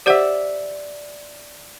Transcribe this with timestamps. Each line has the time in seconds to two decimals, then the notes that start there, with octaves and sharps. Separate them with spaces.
0.06 G4 C5 D5 E5 F#5